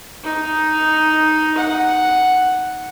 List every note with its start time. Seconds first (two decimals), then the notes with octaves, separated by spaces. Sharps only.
0.23 D#4
1.58 F#5